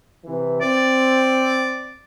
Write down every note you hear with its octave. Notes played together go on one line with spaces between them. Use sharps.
C3 E3
C4 D5